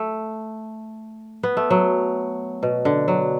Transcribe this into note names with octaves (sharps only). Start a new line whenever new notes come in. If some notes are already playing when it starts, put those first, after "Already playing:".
Already playing: A3
B3
A3
F#3
B2
D3
F#3